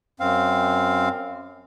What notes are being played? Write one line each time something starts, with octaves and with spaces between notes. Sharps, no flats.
F#2 C4 F5